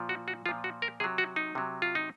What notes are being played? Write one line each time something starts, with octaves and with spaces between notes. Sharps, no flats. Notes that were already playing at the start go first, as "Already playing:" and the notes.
Already playing: A#2 F3
F#4
F#4
A#2 F3 F4
F#4
A#4
C3 F#3 G#4
F#4
D#4
C3 F#3
F4
D#4